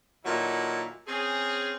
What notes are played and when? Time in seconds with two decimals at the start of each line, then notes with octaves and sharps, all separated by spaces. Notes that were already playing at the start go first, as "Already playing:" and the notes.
0.25 A#2 D#3 F#3 E4 A4
1.07 C4 C#4 G#4